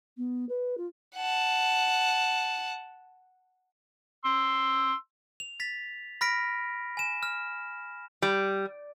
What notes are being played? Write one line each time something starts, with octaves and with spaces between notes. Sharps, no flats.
B3
B4
F4
F#5 A5
C6 E6
F7
A6 B6 F7
B5 F6 A#6 B6 D7
G#5 E7
F6
G3